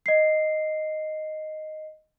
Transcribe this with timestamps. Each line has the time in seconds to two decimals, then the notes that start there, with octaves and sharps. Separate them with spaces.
0.06 D#5 C7